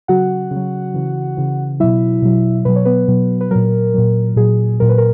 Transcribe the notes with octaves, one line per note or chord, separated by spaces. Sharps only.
C#3 F#3 F#4 F#5
C#3
F#3
C#3 E3
C#3 E3
B2 F#3 E4 E5
B2 F#3
B2 F#3 B4
C#5
B3 B4
B2 F#3
B4
A#2 F#3 A#4
A#2 F#3
A#2 F#3 G#4
A#2 F#3 A#4
B4
A#4